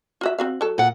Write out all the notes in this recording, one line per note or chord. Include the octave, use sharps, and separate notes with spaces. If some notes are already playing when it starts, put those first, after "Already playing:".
F4 F#4 E5
C4 F#4 F5
F#3 A4
A#2 F#5